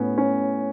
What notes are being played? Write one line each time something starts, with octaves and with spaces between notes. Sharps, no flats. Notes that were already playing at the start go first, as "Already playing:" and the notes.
Already playing: A2 B3 C#4
C#4